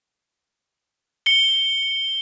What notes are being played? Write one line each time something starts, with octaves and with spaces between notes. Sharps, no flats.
C#7 G7